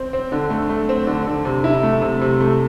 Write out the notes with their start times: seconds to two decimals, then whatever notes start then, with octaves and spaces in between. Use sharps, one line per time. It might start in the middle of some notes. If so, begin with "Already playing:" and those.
Already playing: C4
0.13 C4
0.32 D3
0.50 A3
0.69 A3
0.89 C4
1.07 D3
1.27 D3
1.45 C3
1.64 E4
1.83 A3
2.02 C3
2.21 C3
2.40 A3